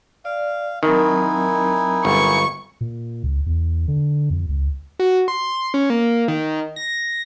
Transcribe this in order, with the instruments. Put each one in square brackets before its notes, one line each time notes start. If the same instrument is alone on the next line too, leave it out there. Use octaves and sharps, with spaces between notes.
[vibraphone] D5 [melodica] F5
[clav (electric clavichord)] D#3 [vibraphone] F#3 C4 A#4 [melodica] D#4 E4 G#5
[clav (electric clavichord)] G1 [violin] C#6
[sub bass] A#2
C#2
E2
D3
F2
C#2
[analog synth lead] F#4
C6
C#4
A#3
D#3
A#6